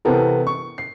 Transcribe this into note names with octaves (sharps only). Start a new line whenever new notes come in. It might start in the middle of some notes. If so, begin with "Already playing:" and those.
C3 E3 B3 C4 A4 A#4
C#6
C7